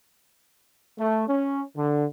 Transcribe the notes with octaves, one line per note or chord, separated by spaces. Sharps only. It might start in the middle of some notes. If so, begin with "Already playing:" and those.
A3
C#4
D3